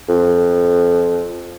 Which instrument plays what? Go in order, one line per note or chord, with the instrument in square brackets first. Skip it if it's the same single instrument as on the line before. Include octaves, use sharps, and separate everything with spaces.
[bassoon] F2